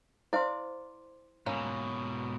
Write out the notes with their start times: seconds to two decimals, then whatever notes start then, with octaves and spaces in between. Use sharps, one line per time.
0.33 E4 C5 D5 F5 C6
1.46 G#2 B2 A#3 C#4 F5